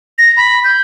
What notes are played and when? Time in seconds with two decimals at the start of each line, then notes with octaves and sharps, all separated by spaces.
0.18 A#6
0.37 B5
0.64 G6